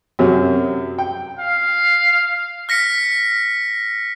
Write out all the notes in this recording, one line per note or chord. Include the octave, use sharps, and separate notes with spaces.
F#2 C3 F#3
G5
F5
F6 A#6 B6 C#7